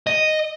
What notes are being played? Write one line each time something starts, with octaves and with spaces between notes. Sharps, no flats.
D#5